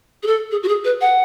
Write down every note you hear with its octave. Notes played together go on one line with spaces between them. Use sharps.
G#4
A4
G#4
F#4
G#4
B4
F#5